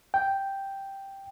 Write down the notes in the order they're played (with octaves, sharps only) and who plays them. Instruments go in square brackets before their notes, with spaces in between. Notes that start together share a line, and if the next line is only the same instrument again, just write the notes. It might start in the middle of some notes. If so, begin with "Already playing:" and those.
[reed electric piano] G5